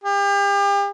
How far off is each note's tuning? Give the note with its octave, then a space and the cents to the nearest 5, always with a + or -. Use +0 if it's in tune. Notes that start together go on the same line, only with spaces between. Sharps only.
G4 +40